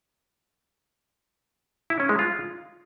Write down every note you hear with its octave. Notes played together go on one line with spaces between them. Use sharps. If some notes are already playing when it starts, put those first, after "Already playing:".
E4
C#4
G#3
F4